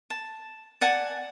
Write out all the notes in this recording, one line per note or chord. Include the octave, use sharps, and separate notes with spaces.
A5
D5 F#5 G#5 A5